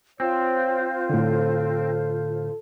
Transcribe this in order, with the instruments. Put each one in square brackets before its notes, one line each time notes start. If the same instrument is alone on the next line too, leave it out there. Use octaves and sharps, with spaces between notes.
[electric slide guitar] C4 [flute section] F4 C5 [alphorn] C#5
[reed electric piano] A2 D3 [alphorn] A4